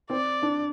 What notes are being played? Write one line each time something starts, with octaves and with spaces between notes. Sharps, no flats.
C4 D5
D4